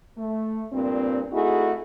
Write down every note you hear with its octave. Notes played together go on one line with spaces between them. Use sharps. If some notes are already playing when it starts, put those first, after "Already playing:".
A3
G2 A#2 C4
A3 D#4 E4 F#4 G#4